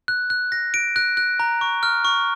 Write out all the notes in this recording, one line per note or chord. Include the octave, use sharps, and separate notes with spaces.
F#6
F#6
A#6
D7
F#6
F#6
A#5
C#6
F6
C#6